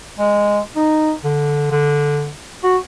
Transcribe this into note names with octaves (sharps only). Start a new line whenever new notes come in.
G#3
D#4
D3
D3
F#4